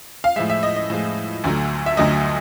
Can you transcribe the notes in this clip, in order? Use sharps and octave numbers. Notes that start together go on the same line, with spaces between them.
F5
A2 F3 G#3 E5
E5
D#5
D#5
A2 F3 G#3
D2 D3 F#3 A3
E5
D2 D3 F#3 A3 D#5